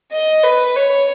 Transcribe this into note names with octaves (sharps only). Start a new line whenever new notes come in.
D#5
B4
C#5